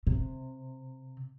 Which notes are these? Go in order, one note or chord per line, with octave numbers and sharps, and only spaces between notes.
C3